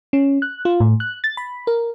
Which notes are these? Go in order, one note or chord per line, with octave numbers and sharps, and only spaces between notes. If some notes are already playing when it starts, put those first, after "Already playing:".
C#4
F#6
F4
A2
F#6
A6
B5
A#4